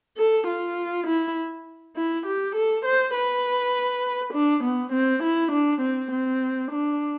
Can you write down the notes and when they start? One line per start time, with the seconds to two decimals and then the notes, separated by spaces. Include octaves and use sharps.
0.17 A4
0.47 F4
1.07 E4
1.96 E4
2.26 G4
2.55 A4
2.85 C5
3.15 B4
4.33 D4
4.64 B3
4.92 C4
5.23 E4
5.51 D4
5.81 C4
6.11 C4
6.71 D4